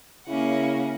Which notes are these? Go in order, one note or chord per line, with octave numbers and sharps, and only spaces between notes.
C#3 A#3 C#4 E4 F#5